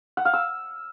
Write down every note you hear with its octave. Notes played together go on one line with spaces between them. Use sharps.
F#5
F5
E6